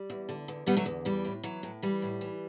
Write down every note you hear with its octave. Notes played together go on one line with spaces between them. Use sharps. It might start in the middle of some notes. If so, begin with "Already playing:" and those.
Already playing: G3
E2
D3
E2
D3 G3 B3
F#3 A3
E2
E3 G3
A2
E3 F#3
A2
E3 G3
A2
E3